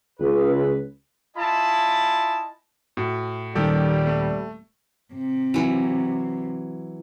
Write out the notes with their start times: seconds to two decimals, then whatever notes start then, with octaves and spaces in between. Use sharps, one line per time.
0.20 C#2 B4
1.36 E4 F4 D#5 G#5 A5 B5
2.97 A2 F#4
3.55 D#1 D#3 G3 G4 A4
4.07 A3
5.14 C3
5.54 E3 F#3